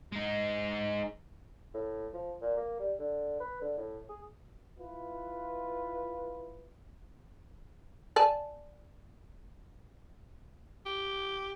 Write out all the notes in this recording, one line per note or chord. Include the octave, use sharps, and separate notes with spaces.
G#3 D#4
A2
F3
A#2
A#3
G3
D3
B4
D3
A2
G#4
E4 F4 B4
D5 G#5 A5
G4